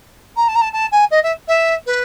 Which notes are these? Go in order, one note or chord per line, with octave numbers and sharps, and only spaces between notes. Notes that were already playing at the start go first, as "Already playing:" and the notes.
A#5
A5
A#5
A5
A5
G#5
D#5
E5
E5
B4